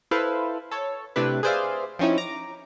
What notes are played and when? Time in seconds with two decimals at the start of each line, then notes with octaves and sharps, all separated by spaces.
0.11 E4 A4 B4 C5 F5
0.71 A4 C#5
1.16 C3 A3 D4 E4 G4 B4
1.43 G#4 B4 C5 D5 E5 F5
1.99 F3 C4 C#4 D#4 E4
2.18 A#5 D6